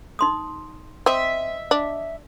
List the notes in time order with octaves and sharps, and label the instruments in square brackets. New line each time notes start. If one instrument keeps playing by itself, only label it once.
[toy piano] D#4 C6 D#6
[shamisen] C4 [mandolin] D#5 E5
[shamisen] D4